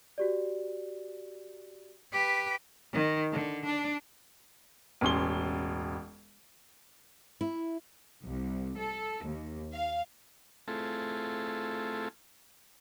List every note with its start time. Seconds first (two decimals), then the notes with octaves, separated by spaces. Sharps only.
0.18 F#4 G4 D5
2.13 G4 B4
2.93 D#3
3.32 D3
3.65 D4
5.01 E1 A1 C#4 C6 G7
7.41 E4
8.24 C2
8.78 A4
9.24 D#2
9.73 F5
10.68 A3 C4 E4 F4 G#4 A4